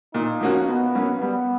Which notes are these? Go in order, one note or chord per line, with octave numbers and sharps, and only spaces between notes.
A#2 D#4
F3 A#3 C#4 F#4
B2 B3
F#3 A#3 C#4
G3 B3